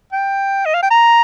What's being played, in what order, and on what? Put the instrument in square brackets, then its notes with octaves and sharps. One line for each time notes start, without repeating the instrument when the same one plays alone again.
[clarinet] G5
D#5
F5
G5
A#5